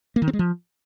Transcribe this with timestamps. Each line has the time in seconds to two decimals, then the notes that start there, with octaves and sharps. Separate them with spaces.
0.16 A#3
0.22 D#3
0.28 C4
0.33 G#3
0.39 F3